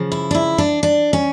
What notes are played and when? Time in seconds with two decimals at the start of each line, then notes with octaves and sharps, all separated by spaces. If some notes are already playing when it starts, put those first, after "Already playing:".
Already playing: C#3 F3
0.12 E4
0.31 D4
0.35 E4
0.58 D4
0.83 D4
1.13 C#4